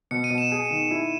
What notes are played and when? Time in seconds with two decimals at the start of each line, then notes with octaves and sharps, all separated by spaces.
0.11 B2 C#7
0.24 D#7
0.30 B2
0.38 E7
0.52 G#4
0.71 D#3
0.91 E4